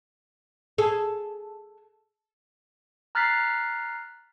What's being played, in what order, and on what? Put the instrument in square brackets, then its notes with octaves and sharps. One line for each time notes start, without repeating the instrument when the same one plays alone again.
[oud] G#4 A4
[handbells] A#5 F6 F#6 A6 B6 C7